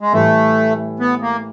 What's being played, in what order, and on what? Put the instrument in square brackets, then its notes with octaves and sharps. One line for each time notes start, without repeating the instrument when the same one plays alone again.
[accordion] G#3
[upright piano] A2 E3 G3 [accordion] A3
[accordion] B3
A#3